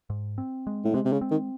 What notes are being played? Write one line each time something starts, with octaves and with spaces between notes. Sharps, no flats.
G#2
C4
G#3
A2
C3 G#3
C3
C#3
C4
D#3